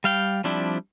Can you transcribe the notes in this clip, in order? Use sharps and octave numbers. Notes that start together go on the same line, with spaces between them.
G3 F5 G5
F3 G3 C4 D4 E4